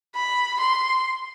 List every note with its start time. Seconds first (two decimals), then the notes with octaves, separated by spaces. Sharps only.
0.16 B5
0.61 C6